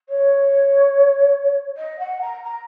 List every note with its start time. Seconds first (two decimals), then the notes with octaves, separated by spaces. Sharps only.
0.09 C#5
1.76 D#5
1.99 F#5
2.21 A#5
2.43 A#5